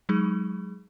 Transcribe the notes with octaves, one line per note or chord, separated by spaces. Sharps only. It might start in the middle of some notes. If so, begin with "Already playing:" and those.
F#3 G#3 D#4 G#4